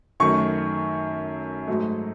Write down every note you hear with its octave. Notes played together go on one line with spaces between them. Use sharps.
F#2 D#3 F#3 A3 C#6
G#2 F#3 A3